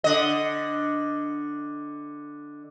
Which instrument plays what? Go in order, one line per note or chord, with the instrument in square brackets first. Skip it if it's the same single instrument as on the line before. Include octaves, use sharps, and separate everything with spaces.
[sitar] D3 D#5